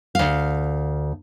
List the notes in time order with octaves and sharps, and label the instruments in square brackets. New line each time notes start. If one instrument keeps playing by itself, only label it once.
[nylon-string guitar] D2 F5